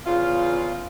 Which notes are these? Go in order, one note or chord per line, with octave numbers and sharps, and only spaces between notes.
E2 C#3 F4